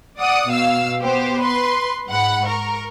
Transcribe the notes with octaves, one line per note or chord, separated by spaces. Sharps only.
D5 F#5 D#6
B2 F5 E6
B3 G4 C5
B4 C6
G#2 F#5 B5
A#4 C#6